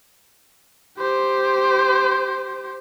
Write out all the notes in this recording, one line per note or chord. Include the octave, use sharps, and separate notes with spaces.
G4 C5